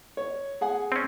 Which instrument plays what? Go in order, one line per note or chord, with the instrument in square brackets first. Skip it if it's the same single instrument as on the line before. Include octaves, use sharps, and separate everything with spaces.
[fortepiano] C#5
G#4 F#5 G#5
[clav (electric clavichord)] C4 C#4